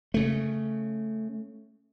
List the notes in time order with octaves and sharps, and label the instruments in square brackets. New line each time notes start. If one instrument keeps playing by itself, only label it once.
[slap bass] C#3 A3